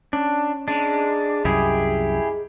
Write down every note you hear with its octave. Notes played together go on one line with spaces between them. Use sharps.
C#4 D4
G#2 G#3 D4
C2 F#2 E4 G4 G#4